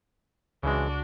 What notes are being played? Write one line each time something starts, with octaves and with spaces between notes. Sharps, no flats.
C#2 C#3 E3 G#3 D4 F#4